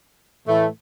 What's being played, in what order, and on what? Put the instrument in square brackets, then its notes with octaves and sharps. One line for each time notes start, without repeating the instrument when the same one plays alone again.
[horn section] A2 E3 A3 E4